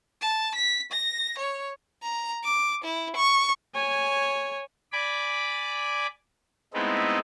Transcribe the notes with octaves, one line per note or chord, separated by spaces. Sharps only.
A5
B6
A#6
C#5
A#5
D6
E4
C#6
C#5 G#5
D5 G#5 B5 D6
G#3 A3 B3 C4 D#4 E4